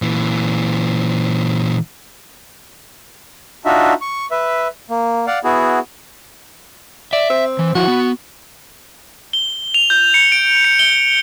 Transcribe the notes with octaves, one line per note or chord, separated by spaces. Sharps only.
A#2 E3
D4 D#4 F4 F#4 E5
C#6
B4 E5
A#3
D5 F5 F#5
B3 E4 F#4 G#4
D5 E5
C4
E3
F3 E4 F#4
B3
G7
F7
G6
C#7
D7
C#7
G7